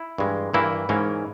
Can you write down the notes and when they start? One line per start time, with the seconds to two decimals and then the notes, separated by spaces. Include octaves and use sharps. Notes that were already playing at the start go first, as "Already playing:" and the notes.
Already playing: E4
0.18 G2 E3 G#3
0.54 G2 E3 A#3 E4
0.89 G#2 E3 A#3 C#4